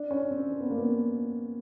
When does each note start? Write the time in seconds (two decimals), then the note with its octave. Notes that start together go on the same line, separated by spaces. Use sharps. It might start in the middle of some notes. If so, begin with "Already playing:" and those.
Already playing: D4
0.11 C#4
0.31 C4
0.51 C4
0.60 B3
0.70 A#3
0.79 B3